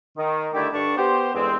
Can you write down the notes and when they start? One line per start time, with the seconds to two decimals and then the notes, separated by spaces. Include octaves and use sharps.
0.17 D#3
0.53 D3 D#3 G3 A3 E4 G4
0.73 G2 D3 G3 D4 C#6
0.97 B3 G4 C5
1.34 E2 G2 D3 G#3 C4